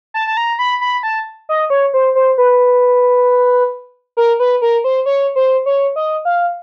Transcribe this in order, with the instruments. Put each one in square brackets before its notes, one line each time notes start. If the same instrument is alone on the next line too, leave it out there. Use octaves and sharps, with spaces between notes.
[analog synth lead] A5
A5
A#5
B5
B5
A5
D#5
C#5
C5
C5
B4
A#4
B4
A#4
C5
C#5
C5
C#5
D#5
F5